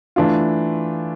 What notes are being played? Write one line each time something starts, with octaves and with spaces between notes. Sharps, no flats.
E3 A3 D4 F4